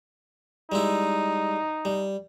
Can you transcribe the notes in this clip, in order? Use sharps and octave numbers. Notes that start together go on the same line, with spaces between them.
G3 G#3 D#4 E4
G3